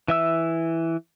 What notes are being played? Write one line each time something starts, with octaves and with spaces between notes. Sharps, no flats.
E3 E5 E6